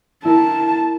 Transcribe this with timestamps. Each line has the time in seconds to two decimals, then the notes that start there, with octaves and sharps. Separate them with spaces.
0.25 E4 A#4 A5